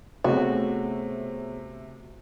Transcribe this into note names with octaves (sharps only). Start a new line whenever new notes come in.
C3 A3 B3 F#4 G#4 C#5